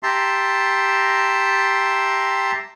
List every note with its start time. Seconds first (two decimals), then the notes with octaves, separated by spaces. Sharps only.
0.03 G4 E5 A5 A#5 C6